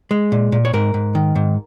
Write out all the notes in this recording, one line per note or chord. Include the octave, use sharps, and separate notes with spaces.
G#3
A#2
A#2
C#5
G#2 A#4
G#2
D#3
G#2